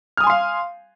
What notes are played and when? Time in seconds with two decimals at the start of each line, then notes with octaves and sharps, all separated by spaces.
0.17 F6
0.21 D#6
0.24 G#5
0.27 C6
0.30 F5